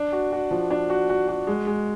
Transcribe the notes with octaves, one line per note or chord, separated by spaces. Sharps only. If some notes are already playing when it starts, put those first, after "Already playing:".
Already playing: D4
F#4
F#4
F3
D4
F#4
F#4
F#4
G#3
G#3